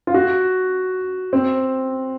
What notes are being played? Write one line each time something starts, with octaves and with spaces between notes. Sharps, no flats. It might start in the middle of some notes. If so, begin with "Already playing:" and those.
F4
F#4
C4